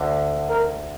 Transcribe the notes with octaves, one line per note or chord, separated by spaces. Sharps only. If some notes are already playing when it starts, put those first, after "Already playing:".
Already playing: D2 D3
A#4